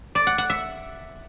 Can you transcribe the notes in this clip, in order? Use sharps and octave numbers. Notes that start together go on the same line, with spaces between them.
D5
F#5
F#5
E5